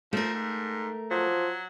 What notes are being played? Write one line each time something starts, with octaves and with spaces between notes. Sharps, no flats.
F3 A3 A#4
G#2
F3 F#3